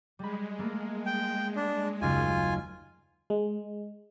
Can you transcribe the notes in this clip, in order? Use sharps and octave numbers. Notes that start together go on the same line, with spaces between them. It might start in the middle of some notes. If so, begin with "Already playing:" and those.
G3 G#3 B5
A3 A#3
G5
D4
F#1 D#2 F4 G#5
G#3